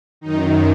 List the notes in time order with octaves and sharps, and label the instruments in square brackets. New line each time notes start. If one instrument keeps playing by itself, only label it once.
[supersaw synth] F#2 D#3 D#4